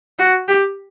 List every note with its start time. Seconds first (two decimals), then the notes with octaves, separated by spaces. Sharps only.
0.19 F#4
0.48 G4